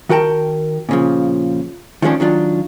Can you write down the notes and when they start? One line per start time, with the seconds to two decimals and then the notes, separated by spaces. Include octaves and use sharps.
0.09 D#3 F#4 A#4 G5 A5
0.89 A#2 C#3 F3
2.02 D#3 F3 G#3 C#4 D4
2.20 D#3 F#3 D4 F4